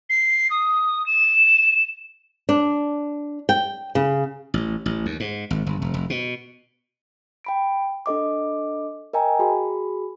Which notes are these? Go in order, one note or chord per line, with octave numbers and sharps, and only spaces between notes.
C7
D#6
E7
D4
G5
C#3
A1
A1
D#2
G#2
G#1
G1
F1
F1
B2
G5 B5 D7
D4 A4 D#5 D6
A#4 D#5 G5 G#5 A#5
F#4 G#4 B5